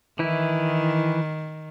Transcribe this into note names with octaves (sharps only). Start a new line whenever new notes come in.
D#3 E3 E4